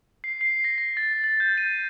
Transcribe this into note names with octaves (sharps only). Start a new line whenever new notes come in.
C7
C7
A#6
A#6
A6
A6
G6
D#7